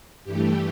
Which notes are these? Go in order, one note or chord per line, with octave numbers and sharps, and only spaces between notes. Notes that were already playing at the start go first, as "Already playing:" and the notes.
G2 E3 A3 G4